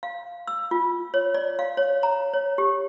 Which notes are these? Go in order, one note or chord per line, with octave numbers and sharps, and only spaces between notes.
F5
E6
F4
C#5
D5
F5
C#5
A#5
C#5
G4